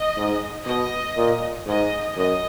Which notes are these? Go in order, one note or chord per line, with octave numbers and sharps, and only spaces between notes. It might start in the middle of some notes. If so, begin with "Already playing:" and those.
Already playing: D#5
G#2
B2 D#5
A#2
G#2 D#5
F#2 D#5